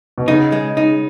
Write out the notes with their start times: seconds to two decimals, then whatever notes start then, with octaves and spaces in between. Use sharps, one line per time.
0.18 B2
0.28 C#3 D#4
0.52 G#3
0.77 D#4